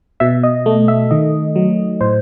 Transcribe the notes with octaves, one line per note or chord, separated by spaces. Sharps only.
B2 E5
D#5
A3
E5
D#3 D#5
F#3
A2 C5